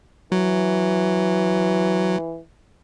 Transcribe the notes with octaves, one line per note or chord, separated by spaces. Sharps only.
E3 F#3